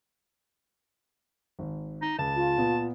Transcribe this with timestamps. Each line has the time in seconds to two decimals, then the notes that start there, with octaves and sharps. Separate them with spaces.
1.59 G#1
2.02 D#4
2.19 C#2 A5
2.36 F4
2.58 A#2 B3